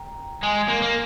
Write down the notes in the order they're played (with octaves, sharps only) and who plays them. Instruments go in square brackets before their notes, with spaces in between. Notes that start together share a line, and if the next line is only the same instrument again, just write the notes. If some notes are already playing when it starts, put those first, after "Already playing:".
Already playing: [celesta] G5 A#5
[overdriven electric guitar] G#3 [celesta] G#5 C6
[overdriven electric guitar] A#3
A#3